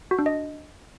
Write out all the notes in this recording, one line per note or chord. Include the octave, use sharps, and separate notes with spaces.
F#4
D4
D#5